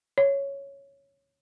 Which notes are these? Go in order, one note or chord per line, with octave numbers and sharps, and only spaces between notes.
C#5